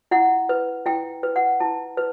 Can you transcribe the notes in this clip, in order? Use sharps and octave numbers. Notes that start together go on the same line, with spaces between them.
E4 F#5
B4
E4 G5
B4
F#5
E4 A5
B4